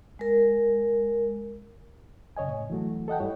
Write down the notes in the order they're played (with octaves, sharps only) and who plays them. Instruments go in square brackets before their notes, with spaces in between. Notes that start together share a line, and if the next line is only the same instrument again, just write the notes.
[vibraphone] G#3 A#4
[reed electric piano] F#2 C#3 C#5 D#5 G#5
A2
E3 F#3 A3 F#4
A4 D#5 F#5 G5
G2 G3 E4 C#5